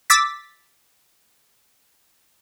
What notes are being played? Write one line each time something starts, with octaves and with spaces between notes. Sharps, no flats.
D6 E6 A6 B6